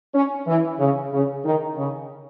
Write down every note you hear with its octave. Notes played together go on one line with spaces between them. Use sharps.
C#4
E3
C#3
C#3
D#3
C#3